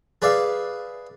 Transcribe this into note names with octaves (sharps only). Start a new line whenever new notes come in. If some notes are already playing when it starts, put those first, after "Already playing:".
G#4 B4 D5 E5 F5